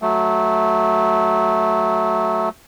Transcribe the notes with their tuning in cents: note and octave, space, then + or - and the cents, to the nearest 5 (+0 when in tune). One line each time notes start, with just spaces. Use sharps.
F#3 +0 A3 -5